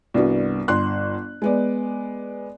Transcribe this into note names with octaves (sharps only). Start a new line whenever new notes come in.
C2 G2 B3 F#4
G1 C6 F#6
G#3 B3 D5